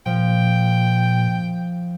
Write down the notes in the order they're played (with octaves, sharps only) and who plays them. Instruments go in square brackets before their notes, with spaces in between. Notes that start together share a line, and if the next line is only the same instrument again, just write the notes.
[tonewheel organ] A#2 [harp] F3 [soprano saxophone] G5